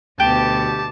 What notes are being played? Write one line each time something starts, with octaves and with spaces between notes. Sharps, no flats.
D2 B2 B3 G4 A5 D6